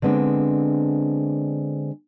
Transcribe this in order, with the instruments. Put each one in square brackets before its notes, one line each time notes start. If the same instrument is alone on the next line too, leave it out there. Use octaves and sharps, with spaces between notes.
[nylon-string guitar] D3 G#3 B3 C4 D4